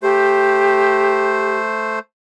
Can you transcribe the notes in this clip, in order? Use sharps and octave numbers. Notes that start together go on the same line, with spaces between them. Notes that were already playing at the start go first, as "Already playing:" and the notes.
A3 G4 C5